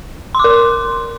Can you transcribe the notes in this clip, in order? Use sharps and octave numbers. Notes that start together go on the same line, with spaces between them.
A#4 C6 D6